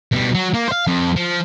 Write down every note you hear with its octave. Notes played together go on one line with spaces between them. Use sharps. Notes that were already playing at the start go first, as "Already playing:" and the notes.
B2 G3
F#3
A#3
C5 F5
F2
F3